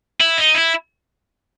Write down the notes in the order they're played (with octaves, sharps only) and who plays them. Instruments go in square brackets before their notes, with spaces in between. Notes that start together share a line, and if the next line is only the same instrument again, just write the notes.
[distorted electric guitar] E4
D#4
E4